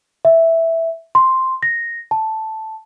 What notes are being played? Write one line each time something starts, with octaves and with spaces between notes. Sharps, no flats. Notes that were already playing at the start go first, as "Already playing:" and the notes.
E5
C6
A#6
A5